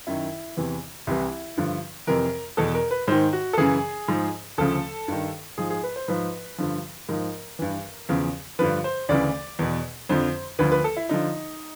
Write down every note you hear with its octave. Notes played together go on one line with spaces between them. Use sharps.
F#2 D#3 E4
E2 C3 E3
C2 C3 E3 E4
G2 D3 F3
F2 C3 E3 A#4
E2 B2 A4
A#4
B4
G#2 D#3 C5
F#4
A4
F#2 C#3 E3 G#4
G#2 F3
D2 C#3 F3 A4
G2 D#3
G#2 F3 G#4
G#4
B4
C5
G#2 F3 B4
G2 D3 F3
G#2 F3 A#4
G2 E3
E2 C#3 F3
G2 D3 F3 B4
C5
D2 C#3 E3 D5
E2 B2
F2 D3 F3 C5
D2 D3 F3 B4
B4
A4
E4
D3 F3 D#4